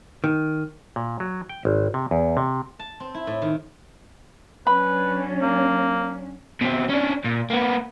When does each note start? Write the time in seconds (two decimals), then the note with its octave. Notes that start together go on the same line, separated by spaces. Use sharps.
0.24 D#3
0.96 A#2
1.20 F#3
1.49 G5
1.65 G#1
1.94 C3
2.11 E2
2.37 C3
2.79 A5
3.00 C4
3.14 E4
3.27 A2
3.42 D#3
4.67 F#3 C#4 D4 B4 B5
5.42 A#3
6.61 B2 C4
6.90 C#4 D4
7.25 A#2
7.50 A#3 B3